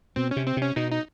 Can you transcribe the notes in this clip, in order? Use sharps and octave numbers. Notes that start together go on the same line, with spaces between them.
B2 C4
C#4
C3
C4
C3
C#4
B2 D#4
D#4